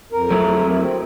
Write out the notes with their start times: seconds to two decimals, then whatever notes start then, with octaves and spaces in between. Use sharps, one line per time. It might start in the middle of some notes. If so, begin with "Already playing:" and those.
0.12 F2 A#4
0.31 F#3 A3 E4
0.82 C4